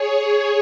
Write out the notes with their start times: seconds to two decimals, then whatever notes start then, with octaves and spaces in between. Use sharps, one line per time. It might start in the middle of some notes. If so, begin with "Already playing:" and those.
Already playing: G#4 C#5